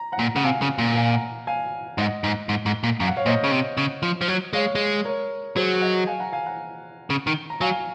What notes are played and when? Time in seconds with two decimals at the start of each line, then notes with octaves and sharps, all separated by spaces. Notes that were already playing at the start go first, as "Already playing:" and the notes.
Already playing: A#5
0.12 F#5 A#5
0.19 A#2
0.36 C#3 F#5
0.44 C3 F5 G#5
0.62 C#3
0.78 A#2
0.95 F5 G#5
1.13 F#5 A#5
1.47 F5 G#5
1.97 G#2 D#5 F#5
2.24 G#2
2.49 G#2
2.66 G#2
2.83 A#2
3.00 F#2 F5
3.08 F#5
3.17 C#5 F5
3.26 A#2 C5 D#5
3.44 C#3
3.52 C3
3.77 C#3
4.03 F3
4.21 F3
4.28 F#3
4.53 G#3 C#5 F5
4.75 G#3
5.05 A#4 C#5
5.56 F#3 G#4 C5
5.81 D#5 F#5
6.07 F5 G#5
6.20 F#5 A#5
6.32 F5 G#5
6.46 F#5 A#5
7.10 C#3
7.27 D#3
7.50 A#5
7.61 F#3 F5 G#5